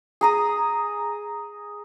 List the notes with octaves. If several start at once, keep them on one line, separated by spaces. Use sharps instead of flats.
G#4 A#5 D#6